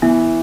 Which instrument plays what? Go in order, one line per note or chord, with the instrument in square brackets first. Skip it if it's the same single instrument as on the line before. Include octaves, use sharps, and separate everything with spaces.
[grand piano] E3 [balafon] B3